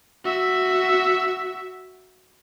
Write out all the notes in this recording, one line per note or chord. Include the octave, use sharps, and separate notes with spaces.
F#4 E5